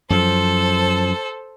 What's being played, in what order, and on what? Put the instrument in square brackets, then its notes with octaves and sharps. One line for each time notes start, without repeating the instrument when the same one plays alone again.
[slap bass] F#2 F3 [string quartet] A4 C5